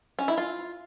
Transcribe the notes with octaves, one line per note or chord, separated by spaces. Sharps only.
C#4
E4
F4